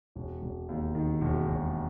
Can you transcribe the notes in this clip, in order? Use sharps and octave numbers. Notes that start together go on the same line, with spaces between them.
E1
E1
D#2
D#3
E1
E1